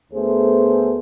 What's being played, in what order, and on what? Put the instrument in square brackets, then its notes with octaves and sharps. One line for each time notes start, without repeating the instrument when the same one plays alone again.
[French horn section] D2 A3 B3 G#4 C5